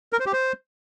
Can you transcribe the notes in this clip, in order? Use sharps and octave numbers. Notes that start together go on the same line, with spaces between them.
A#4
C5
G4
C5